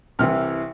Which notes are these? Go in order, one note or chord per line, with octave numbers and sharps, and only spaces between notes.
C2 C3 E3 F6